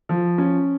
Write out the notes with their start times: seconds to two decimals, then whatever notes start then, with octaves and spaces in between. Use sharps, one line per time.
0.09 F3
0.38 C#4